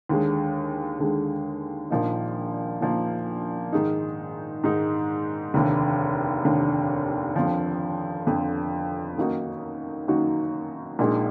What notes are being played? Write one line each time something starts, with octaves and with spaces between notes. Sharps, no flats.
D#2 D3 G#3
D#2 D3 G#3
A#1 A#2 F3 A#3 D#4
A#1 A#2 F3 A#3 D#4
G#2 D#3 G#3 D#4
G#2 D#3 G#3 D#4
F1 D#2 D3
F1 D#2 D3
F2 D3 F3
F2 D3 F3
F#2 D#3 A#3 D#4 F#4
F#2 D#3 A#3 D#4 F#4
A#1 A#2 G#3 D#4